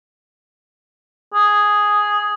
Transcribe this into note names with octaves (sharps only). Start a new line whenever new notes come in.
G#4